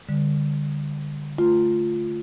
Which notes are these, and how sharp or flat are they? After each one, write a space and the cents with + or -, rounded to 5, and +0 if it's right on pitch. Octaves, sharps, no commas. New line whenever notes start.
D3 +0 G3 +35
A3 +0 F4 +0